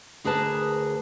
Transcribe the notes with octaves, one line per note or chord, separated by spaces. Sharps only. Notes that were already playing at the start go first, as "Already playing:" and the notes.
D2 G#4 A#4 B4 A5